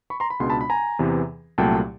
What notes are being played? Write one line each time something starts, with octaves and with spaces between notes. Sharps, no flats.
B5 C#6
A#5 C6
B5
C#2 B2 G#3 B3 D4 C6
A5 B5
B5
G#5 A#5
E2 C3 E3
C2 A#2 F#3 A3 G5 A5